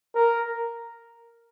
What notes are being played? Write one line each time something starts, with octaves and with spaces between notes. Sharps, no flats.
A#4